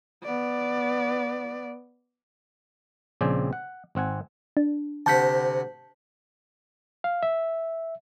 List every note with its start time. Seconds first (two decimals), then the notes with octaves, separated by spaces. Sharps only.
0.24 B3 D5
3.21 A#1 C#3 C4 D5 G5 G#5
3.53 F#5
3.95 G#1 C4 F#5 G#5
4.57 D4
5.06 D2 C3 F#5 A5 G6 B6
7.04 F5
7.23 E5